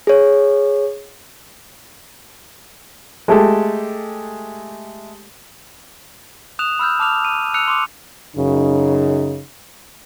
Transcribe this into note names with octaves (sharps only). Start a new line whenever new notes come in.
G#4 C#5
G#3 A3 G4 A4
D#6 F#6 E7 F7
B5 E6 F6 G6
A5 D6 F6 F7
D#7
E6 F#6 C#7 F7
C6 D6
F#2 C#3 D#4